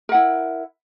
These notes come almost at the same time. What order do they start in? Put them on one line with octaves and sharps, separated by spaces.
A#4 F#5 E4